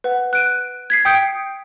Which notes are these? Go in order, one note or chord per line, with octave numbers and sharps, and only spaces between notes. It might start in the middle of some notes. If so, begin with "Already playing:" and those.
B4 F#5
F#6 D7 D#7
G#6 B6 C7
G5 D#6 G6 C#7 D7